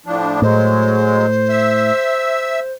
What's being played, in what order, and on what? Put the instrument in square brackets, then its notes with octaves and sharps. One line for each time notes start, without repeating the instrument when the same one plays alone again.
[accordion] A2 F3 D4
[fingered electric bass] A2 [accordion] F#3 G#3 [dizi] C5
[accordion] E5 E6